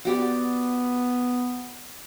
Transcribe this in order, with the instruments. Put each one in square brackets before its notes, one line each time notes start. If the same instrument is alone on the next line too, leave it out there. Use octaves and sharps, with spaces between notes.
[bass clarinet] B3 [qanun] F#4 G4 D5